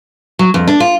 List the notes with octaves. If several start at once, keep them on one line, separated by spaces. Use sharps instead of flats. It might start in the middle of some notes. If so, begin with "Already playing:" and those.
F#3
F2
D4
F4